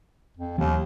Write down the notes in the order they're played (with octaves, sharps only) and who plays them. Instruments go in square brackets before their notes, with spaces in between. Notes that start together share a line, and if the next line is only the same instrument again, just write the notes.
[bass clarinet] F2
[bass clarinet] D#2 [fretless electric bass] E3 F#3 A#3